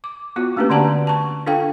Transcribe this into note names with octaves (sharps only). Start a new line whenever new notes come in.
D6
B3 F4 F#4
A3 A#3 C#4 D4 G4 B4
D3 A#3 D5 F#5 A5 A#5
A5 C#6
D4 F4 A4 F5 G5